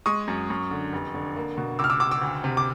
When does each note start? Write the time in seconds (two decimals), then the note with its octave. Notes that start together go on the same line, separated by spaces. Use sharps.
0.06 G#3 C#6 D#6
0.28 F#2
0.50 F#2
0.71 D3
0.93 F1
1.14 D3
1.36 A#3
1.58 B2
1.79 C#2 D6 E6
1.84 F6
1.90 D6 E6
2.00 C#2 D6 E6
2.11 D6 E6
2.22 D2
2.44 C3
2.57 D6